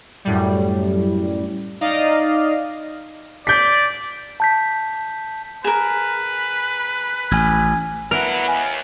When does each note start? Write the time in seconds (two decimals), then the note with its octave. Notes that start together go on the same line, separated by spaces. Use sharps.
0.25 F#2 A2 G3
1.81 D#4 D5 D#5 F5
3.47 D5 G6 B6
4.40 A5 G6 B6
5.64 G#4 A#4 B4 E7
7.31 A1 G#5 F6 G#6
8.11 D3 F#3 B3 E4 A#4 B4
8.48 D#2 G#5